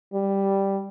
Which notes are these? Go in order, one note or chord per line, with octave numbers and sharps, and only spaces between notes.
G3